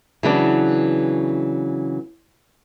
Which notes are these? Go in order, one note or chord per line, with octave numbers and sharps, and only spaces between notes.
C#3 E3 F#3 B3 D4